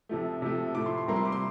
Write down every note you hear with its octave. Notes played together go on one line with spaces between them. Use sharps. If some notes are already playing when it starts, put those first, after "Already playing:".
C3 F3 A3
C3 F3 A3
A2 F3 A3 D6
C6
C6
C3 G3 A#3 A#5
C6
D6
C6